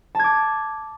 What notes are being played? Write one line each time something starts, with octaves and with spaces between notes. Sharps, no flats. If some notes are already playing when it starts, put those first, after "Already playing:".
A5 D6 G#6